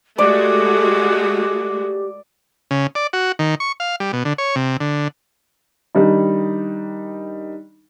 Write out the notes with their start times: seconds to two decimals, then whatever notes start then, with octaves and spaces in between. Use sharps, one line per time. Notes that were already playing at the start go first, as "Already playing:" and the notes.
0.18 G#3 A3 F#4 G4 D5
2.71 C#3
2.95 D5
3.13 F#4
3.39 D#3
3.60 C#6
3.80 F5
4.00 G3
4.13 B2
4.25 D3
4.38 C#5
4.56 C3
4.80 D3
5.95 D#3 G3 D4 D#4